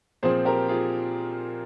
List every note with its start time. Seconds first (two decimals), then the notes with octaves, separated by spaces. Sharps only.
0.23 A#2 F3 C4 G#4 C5
0.45 G4 A#4
0.68 F4 G#4